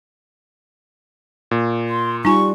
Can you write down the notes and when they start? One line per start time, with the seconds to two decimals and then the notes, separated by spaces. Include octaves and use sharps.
1.51 A#2
1.89 C6
2.25 G3 D#4 F4 G#5 C#6